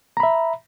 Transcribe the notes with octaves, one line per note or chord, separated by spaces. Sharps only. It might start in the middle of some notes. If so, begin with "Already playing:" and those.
E5 A#5 B5